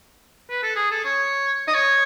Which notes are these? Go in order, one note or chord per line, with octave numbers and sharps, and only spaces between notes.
B4
A4
G#4
A4
C#5
D#5
C#5